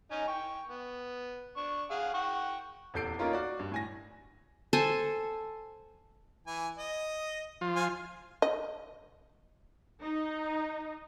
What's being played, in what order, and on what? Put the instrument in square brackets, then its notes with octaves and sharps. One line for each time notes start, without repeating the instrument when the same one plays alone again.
[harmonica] C#4 D#4 G#5
G5 C#6
B3
D4 C#6
G#4 F5 F#5
F#5 G5 C#6
[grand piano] D#1 E2 A4 G6 C7 D7
A#3 C#4 D#4 F4 A#4
F#4 D5
G2
A2 G#5 A#6
[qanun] A4 C5 G#5
[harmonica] E3 G#5
D#5
[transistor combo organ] F3 F4
[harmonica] C5 F5 G#5
[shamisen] D#5
[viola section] D#4